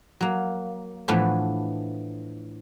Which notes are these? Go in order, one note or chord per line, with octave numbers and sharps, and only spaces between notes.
F#3 A#3
A2 E3 F3 A3 B3 D4